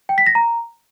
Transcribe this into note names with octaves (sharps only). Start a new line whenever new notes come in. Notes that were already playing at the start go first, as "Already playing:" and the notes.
G5
B6
A#6
A#5